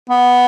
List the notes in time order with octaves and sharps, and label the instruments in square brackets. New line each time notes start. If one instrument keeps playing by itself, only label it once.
[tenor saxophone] B3